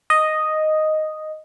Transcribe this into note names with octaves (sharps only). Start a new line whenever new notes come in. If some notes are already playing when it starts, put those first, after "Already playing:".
D#5